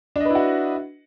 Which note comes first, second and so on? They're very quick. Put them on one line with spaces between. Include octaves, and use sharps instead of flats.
D4 D#5 B4 E4 F#4